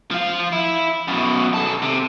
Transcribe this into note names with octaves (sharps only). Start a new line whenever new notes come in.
F3 F4
E4
F#2 B2
D#3 A4
C3